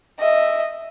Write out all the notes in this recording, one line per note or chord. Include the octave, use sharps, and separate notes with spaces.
D#5 E5